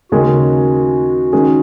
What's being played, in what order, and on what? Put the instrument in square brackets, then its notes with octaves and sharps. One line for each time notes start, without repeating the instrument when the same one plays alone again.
[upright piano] D#2 C#3 G#3 C#4 G#4 [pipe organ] F#4
[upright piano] D#3 G#3 C#4 G#4